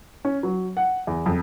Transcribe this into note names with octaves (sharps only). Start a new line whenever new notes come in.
C#4
F#3
F#5
E2
F2